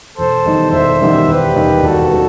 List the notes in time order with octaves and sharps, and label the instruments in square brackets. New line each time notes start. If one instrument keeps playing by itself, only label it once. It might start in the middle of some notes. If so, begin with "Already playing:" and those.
[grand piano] E1 [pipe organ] A4 C5
[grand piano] E2 D#3 G3 D#4
[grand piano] E1 [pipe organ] C5 E5
[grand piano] E2 D#3 G3 D#4
[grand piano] E1 [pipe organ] G4 B4
[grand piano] D#2 D#3 G3 D#4
[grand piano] E1 [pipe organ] F#4 A4
[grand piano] D#3 G3